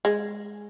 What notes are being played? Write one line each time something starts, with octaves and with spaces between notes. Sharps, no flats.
G#3